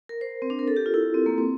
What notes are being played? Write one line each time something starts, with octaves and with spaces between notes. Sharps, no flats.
A#4
C5
C4
D4
A#4
A4
G4
F4
E4
C4
A#3
C4